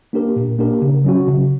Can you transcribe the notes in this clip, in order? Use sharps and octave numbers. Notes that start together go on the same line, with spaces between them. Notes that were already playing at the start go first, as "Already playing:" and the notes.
A#3 D4 G4 A#4
A#2
A#3 D4 G4 A#4
C#3
F#3 C#4 F#4
C#3